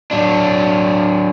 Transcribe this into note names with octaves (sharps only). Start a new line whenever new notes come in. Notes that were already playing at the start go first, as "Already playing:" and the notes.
F#3 D4